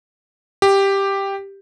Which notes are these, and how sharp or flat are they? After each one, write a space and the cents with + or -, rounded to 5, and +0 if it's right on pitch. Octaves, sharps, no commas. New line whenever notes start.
G4 +5